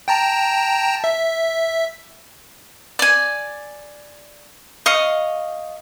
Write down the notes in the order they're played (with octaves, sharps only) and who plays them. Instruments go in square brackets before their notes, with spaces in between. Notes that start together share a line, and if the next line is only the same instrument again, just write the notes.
[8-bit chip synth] G5 A5 A#5
E5
[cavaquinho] D5 G#5
D#5 F5 C#6